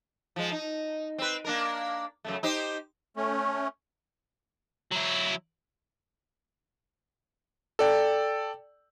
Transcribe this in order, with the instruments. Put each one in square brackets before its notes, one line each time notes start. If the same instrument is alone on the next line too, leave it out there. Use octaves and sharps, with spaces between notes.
[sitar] F3 G#3
D#4
C4 B4
A#3 D4 A#4
F#2 C#3 A3
D#4 G4 C5
[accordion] A3 C#4
[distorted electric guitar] F#3 E4
[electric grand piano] A4 D5 G5